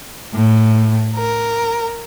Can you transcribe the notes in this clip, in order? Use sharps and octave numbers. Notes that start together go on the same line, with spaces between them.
A2
A#4